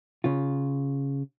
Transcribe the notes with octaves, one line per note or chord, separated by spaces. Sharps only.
C#3 F4